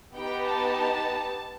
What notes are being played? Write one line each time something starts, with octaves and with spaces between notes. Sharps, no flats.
B3 D#4 G4 G5
A5